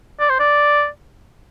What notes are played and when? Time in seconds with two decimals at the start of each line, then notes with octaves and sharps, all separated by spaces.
0.20 D5
0.30 C5
0.40 D5